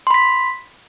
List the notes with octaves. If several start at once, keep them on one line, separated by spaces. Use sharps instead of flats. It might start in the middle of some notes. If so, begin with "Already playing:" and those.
B5 C6 B6